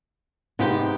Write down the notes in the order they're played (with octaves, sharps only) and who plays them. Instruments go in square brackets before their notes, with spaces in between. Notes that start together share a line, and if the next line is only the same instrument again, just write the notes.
[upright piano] G#2 C3 D#3 [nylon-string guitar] G#3 B3 G4